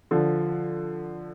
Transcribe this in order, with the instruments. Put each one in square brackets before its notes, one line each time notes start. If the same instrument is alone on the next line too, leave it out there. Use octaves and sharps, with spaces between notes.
[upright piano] D3 F3